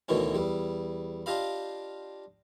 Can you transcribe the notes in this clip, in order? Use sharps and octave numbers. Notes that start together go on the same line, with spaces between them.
D2 B2 D#3 E3 C#4
E2 G3
D4 F4 G4 D#5 F5 B5